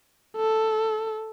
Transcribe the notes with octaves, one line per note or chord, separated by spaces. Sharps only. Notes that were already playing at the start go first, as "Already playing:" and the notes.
A4